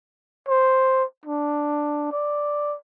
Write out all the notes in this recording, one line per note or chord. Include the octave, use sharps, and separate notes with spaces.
C5
D4
D5